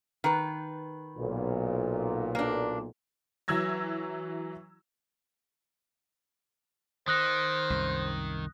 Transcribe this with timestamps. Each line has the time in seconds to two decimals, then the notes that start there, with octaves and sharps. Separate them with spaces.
0.24 D#3 B4
1.17 B1 A#2
2.35 A#3 D4
3.48 E3 F#3 E6 G#6 A#6
7.08 D#3 C5 D#6 F#6 A#6
7.70 C2 F#2